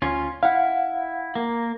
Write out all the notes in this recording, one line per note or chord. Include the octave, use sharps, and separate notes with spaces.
D2 C#4 F4
E4 F5 F#5
A#3